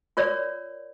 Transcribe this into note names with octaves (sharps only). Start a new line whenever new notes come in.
F4 A#4 C#5 D5